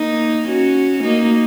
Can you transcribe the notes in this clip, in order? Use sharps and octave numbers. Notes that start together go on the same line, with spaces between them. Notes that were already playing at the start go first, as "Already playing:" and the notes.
Already playing: A#3 D#4
C#4 F#4
A#3 D#4